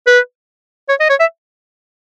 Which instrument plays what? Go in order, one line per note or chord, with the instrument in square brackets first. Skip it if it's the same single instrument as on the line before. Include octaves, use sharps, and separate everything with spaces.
[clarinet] B4
C#5
D#5
C#5
E5